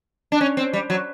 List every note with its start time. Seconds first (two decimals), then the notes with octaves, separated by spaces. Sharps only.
0.32 D4
0.41 C#4
0.57 C4
0.73 G3
0.90 F#3